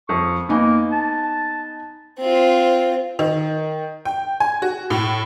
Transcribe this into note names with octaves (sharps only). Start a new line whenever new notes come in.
F2 C#6
A#3 B3 D#4 G#5
A5
C4 F4
D#3
G5
G#5
F#4
A2